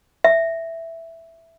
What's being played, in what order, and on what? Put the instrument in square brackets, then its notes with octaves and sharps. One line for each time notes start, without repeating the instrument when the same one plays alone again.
[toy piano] E5